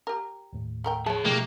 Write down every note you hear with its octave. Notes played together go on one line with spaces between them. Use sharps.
G4 A#4
D#2 A2
A3 A#4 G5
G#4 C#5 E5 A5
B2 F3 G3 A3 A#3 D#4 G4